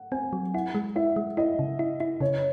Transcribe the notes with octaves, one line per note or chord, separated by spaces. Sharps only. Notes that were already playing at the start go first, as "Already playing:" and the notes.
Already playing: F#5
C4 G#5
F#3
E4 F#5
G#3
E4 E5
G#3
E4 D#5
C#3
E4
E4
C#3 C#5